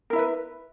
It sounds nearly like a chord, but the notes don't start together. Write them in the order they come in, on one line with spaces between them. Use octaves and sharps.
A#4 E4 E5 B4